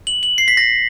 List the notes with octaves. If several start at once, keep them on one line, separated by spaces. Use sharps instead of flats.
F#7
F#7
C7
B6
A#6